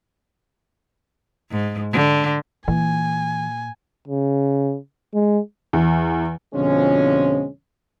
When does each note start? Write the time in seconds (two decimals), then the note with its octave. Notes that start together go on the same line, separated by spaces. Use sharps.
1.50 G#2
1.92 D3
2.68 A#2 E3 G#5
4.08 C#3
5.15 G#3
5.73 E2
6.54 F2 B2 D3 F3 G#3 C#4